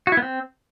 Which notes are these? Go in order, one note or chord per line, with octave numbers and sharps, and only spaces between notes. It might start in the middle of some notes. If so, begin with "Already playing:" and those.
F#4
E4
B3
C4